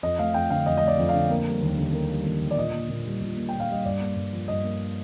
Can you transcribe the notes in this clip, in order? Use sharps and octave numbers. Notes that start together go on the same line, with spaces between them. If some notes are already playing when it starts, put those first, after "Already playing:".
F2 D#5
A3 F5
F2 G5
D3 F5
F2 D#5
A3 D#5
D5
F2
F5
D3
A#3
G3
D#2
D3
A#3
G3
D#2
D3
D5
A#2 D#5
A#3
A#2
G3
A#2
A#3
A#2 G5
F5
G3 D#5
G2 D5
A#3
G2
F3
G2 D#5
A#3